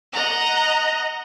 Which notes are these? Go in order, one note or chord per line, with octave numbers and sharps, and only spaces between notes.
D#5 F#5 A#5